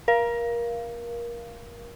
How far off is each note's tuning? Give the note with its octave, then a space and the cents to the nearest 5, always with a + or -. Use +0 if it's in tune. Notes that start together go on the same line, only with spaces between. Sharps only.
A#4 +25 F5 -15